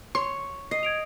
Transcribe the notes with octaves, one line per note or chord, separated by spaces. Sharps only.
C#5 C6
D#5 C7
G#6 D7 F7